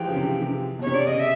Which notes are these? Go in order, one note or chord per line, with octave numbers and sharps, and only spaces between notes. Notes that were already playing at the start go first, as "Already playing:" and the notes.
Already playing: E3 F3 G3 G#3 G5
C#3
C3
C3
B2 C#5
C3
D5
C#3 D#5
E5